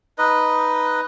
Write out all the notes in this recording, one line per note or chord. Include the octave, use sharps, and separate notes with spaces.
D#4 B4 D#5